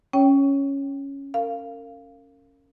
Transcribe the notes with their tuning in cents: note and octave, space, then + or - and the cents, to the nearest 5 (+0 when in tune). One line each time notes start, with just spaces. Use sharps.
C#4 +0 C#5 +0 G5 +0
A#4 -30 F5 -10